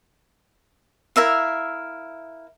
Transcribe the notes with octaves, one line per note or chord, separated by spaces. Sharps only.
E4 A#4 E5 F5